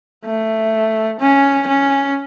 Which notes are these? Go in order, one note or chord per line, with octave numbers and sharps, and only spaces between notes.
A3
C#4
C#4